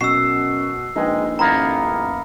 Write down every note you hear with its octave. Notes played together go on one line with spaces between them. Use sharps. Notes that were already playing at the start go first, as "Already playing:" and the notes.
F#2 B2 C#6 E6 C7 E7
A#1 G#3 D#4 B4 G5
A1 F#2 A#3 B3 A#5